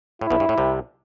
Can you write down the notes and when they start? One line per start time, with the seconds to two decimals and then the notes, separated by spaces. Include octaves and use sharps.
0.21 A2 E4
0.31 B1 B2
0.40 G2
0.49 A2
0.58 C2 C3